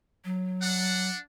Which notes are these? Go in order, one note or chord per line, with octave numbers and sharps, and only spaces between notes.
F#3
D4 F#5